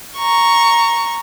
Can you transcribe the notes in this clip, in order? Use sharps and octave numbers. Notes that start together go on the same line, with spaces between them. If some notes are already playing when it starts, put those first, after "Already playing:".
A#5 C#6